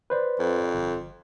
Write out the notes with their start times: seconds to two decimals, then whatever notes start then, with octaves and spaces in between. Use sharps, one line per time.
0.10 B4 C5 D5
0.39 F2
0.73 G1